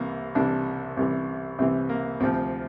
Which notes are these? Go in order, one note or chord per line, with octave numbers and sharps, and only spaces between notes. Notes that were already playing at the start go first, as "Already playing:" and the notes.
Already playing: C2 C3 E3 A#3
C2 C3 E3 D4
C2 C3 E3
C2 C3 E3 C4
A#3
D2 C3 F3 C4